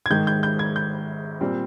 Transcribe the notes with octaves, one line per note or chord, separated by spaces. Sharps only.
G#6
G#2 D#3 G#3 G6
G6
G6
G#6
G6
A#2 G3 C4